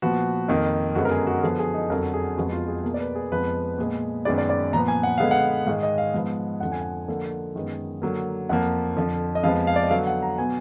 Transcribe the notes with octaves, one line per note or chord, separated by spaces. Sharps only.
A#2 F3 B3 F#4
F2 D#3 A#3
F#2 D3 G#3 B3 F#4
A#4
G#4
F#4
D3 F3 B3 G#4
G#4
D#4
F2 D3 F#3 A#4
G#4
F2 F3 G#3 B3 F#4
F4
G#4
B2 A#3 G#4
D5
B4
G#4
F2 F3 G#3 B3 B4
A#2 G#3 B3
F#2 D#3 G#3 B3 D5
D5
D5
A#2 F3 B3 A#5
G#5
F#5
D3 G#3 B3 F5
F#5
G#2 D#3 G#3 F5
D#5
F5
G#2 F3 G#3 B3
F2 D3 F3 F#5
G#5
F#5
D3 F3 A#3
F#2 D#3 G#3 B3
D3 F#3 A#3
F2 F3 A#3 F#5
F2 D3 F3
D#5
F2 F3 G#3 B3 F5
F5
D5
D#5
D3 F#3 B3 F5
F#5
A#5
B2 F#3 B3 G#5